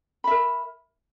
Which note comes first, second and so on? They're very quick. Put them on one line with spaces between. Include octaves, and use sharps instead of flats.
B5 E5 A#4